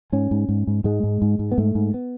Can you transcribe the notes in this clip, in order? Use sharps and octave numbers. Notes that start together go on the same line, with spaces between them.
G#2 C#4
G#2
G#2
G#2
G#2 G#3
G#2
G#2
G#2
B3
G#2 A3
G#2
B3